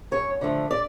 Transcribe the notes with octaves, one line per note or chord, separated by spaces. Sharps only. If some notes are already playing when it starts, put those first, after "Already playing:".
F#2 C#5
D3 F3 A3
D5